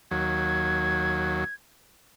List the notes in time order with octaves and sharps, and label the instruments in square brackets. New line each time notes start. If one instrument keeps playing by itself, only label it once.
[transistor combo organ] D#2 F#3 [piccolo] G#6